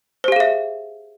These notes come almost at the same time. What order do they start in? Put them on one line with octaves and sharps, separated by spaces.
C5 G4 F5 G#4 E5